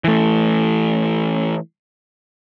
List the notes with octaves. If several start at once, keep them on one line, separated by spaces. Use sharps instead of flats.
E3 A3